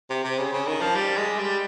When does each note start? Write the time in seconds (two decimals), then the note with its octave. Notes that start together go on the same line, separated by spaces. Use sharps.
0.10 C3
0.24 C3
0.38 C#3
0.53 C#3
0.67 D#3
0.81 F3
0.95 G3
1.17 G#3
1.39 G3